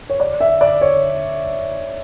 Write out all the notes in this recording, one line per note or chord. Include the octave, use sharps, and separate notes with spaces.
C#5
D5
E5
D5
C#5